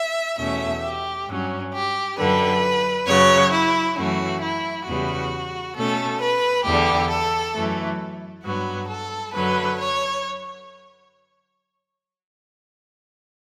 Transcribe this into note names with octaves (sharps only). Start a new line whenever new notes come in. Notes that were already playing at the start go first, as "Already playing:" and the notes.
Already playing: E5
E2 B2 A3 C#4 E5
G4
G2 F#3 C#4
G4
F#2 D3 G3 B4
F#2 C#3 F#3 C#5
E4
F#2 E3 A3 C#4 F#4
E4
E2 C#3 G3 B3 F#4
B2 A3 C#4 A4
B4
E2 D3 G3 G4
A4
F#2 E3 A3
G2 F#3 B3 F#4
A4
F#2 D3 F#3 B4
C#5